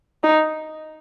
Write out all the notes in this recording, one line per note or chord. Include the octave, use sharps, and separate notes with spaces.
D#4